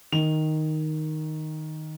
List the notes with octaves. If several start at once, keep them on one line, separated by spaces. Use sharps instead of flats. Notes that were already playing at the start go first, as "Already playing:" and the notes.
D#3 F7